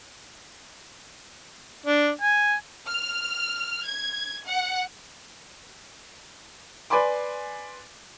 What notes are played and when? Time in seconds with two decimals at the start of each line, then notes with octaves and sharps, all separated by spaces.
1.86 D4
2.21 G#5
2.88 F6
3.85 G#6
4.47 F#5
6.90 B4 D5 G#5 B5 C6 D6